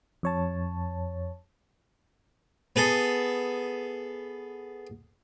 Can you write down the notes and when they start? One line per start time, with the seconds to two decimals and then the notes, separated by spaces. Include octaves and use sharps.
0.23 F2 C#5 A5
2.76 B3 G#4 A4